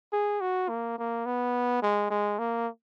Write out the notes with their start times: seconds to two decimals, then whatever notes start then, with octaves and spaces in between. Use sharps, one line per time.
0.13 G#4
0.41 F#4
0.69 A#3
0.98 A#3
1.26 B3
1.82 G#3
2.10 G#3
2.39 A#3